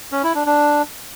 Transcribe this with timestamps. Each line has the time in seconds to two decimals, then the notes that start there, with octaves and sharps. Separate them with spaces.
0.12 C#4
0.24 E4
0.35 D4
0.46 D4